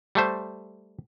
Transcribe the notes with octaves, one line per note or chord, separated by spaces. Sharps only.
G3 A3 C5